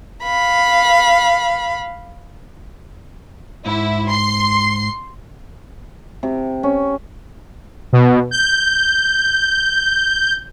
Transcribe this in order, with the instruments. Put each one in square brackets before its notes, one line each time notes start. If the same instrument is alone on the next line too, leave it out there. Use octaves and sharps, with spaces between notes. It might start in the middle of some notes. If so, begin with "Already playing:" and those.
[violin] F5 B5
[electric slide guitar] G#2 [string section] E4
[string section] C6 C7
[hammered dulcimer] C3
C#4
[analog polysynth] B2
G6